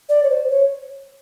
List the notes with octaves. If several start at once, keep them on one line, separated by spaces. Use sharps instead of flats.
D5
C#5
C5
C#5